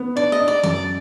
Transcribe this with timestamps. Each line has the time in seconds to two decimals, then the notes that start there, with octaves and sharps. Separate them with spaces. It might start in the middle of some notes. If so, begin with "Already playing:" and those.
Already playing: B3
0.16 D4 D5
0.32 D#5
0.40 D4
0.48 D5
0.63 F#2 D5